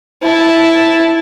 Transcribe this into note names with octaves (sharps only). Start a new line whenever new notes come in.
E4 A5